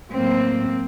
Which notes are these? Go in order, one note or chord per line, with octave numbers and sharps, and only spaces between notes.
A2 F#3 A#3 C4